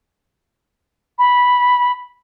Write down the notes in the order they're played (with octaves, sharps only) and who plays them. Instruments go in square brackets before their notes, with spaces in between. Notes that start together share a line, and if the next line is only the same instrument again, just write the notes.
[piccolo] B5